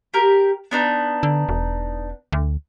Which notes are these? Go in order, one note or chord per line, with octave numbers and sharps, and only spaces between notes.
G4 A#4
B3 D4 D#4
D3
E1
D2